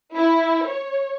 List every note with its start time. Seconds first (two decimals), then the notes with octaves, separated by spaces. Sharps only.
0.16 E4
0.67 C#5